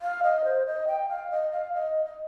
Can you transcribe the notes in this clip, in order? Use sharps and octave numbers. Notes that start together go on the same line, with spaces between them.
F5
D#5
C5
D#5
G5
F5
D#5
F5
D#5
D#5